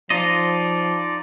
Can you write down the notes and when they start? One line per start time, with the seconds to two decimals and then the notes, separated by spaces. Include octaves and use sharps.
0.10 F3 D#4 F4 D5 D#5